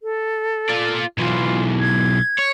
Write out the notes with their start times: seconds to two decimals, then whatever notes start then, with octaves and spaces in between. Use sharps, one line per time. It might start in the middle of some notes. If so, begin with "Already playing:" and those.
0.03 A4
0.70 F4 D5
1.18 B1 E3 F4
1.80 G#6
2.39 C#5